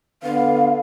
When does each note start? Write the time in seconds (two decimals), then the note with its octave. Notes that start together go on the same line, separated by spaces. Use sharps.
0.23 D3 B3 F5